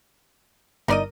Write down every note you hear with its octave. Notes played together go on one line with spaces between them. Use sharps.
G1 D#4 A#4 D5 D#5 D#7